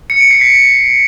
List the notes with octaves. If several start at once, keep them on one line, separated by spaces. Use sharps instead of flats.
C#7
D7
C7
B6